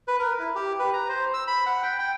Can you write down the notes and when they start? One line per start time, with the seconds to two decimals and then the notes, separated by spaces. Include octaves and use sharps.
0.08 B4
0.19 A#4
0.39 E4
0.55 G4
0.79 B4
0.93 A#5
1.09 C5
1.34 E6
1.47 B5
1.66 F#5
1.83 G5
1.99 G5